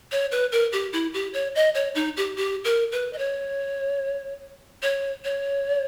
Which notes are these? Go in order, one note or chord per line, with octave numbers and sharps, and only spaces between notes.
C#5
B4
A#4
G4
E4
G4
C#5
D#5
C#5
D#4
G4
G4
A#4
B4
D#5
C#5
C#5
C#5